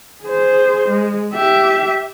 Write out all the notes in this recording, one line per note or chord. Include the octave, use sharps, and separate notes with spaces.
G#4 C5
G#3
G4 E5